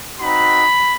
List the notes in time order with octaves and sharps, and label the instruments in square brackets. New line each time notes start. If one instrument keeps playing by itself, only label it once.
[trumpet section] C4 D#4 F#4 B5